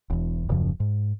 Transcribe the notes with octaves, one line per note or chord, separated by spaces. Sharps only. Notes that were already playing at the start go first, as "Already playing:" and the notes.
E1 E2
D#1 F#2 C#3 F3
G#2